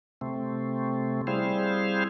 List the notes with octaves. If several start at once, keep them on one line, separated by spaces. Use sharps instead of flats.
C3 A3 C4
G3 C4 E4 G#4 C5 F5